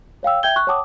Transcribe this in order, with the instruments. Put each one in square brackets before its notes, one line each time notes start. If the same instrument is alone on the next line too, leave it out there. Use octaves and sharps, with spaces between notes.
[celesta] C#5 F5 G5 E6
E5 G5 G6 G#6 G7
C#6 F#6
C#5 F#5 G5 A5 D6 D#6